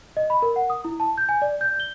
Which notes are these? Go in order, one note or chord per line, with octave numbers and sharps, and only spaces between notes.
D#5
B5
A#4
F#5
D#6
E4
A5
G6
G#5
D5
G6
G7